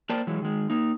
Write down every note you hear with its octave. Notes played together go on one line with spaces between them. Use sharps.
A#3 A#4 C5 D5 G5 A5
E3 F#3 G#3
D#3 G#3
A#3 D#4